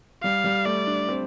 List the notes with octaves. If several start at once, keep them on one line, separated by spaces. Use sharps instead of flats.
G3 F5
G3
A3 D5
D4
C4